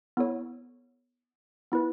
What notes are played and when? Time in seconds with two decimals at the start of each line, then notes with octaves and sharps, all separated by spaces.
0.17 B3 E4 A4 C#5
1.72 B3 E4 B4